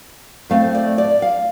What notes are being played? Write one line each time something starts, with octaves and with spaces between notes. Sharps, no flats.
A2 A3 C4 F5
D5
D5
F5